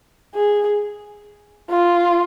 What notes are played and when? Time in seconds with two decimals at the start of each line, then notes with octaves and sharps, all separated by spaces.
0.35 G#4
1.70 F4